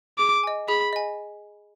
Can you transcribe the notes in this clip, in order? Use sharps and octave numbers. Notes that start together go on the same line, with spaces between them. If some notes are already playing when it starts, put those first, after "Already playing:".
G#4 D6
D#5 G#5
G#4 B5
D#5 G#5